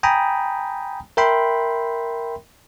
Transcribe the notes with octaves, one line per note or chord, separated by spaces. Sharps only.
G5 G#5 A#5 B5 D#6
A#4 E5 G5 B5 C6